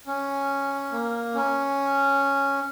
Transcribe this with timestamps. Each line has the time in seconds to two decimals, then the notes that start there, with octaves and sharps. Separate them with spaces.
0.07 C#4
0.92 A#3
1.35 C#4